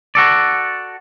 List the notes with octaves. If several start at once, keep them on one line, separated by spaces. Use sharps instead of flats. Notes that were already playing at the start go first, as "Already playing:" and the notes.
F#4 A4 D5